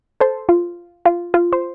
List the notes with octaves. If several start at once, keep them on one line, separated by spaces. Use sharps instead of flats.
A4 C5
F4
F4
F4
C5